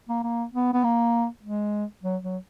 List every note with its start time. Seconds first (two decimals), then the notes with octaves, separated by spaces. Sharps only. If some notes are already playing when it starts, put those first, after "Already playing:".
0.09 A#3
0.23 A#3
0.54 B3
0.73 B3
0.84 A#3
1.43 G#3
2.03 F#3
2.23 F#3